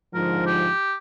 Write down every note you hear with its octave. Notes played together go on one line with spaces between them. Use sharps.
G#2 D3 F3 A#4
G4